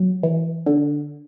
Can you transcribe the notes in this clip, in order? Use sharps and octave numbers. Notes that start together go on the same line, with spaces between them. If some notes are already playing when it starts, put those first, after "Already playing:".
Already playing: F#3
E3
D3